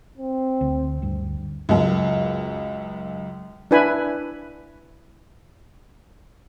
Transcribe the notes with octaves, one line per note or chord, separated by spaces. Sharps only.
C4
D2
D2 G2
C#2 F#2
D4 E4 B4 G#5 B5